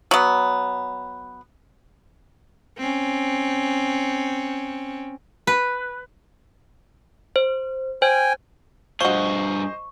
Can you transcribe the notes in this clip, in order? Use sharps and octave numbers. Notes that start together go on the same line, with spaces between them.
F#3 B3
C4 C#4
B4
C5
C5 G5 G#5
G2 F3 F#4 G#4 C5 D#5 C#6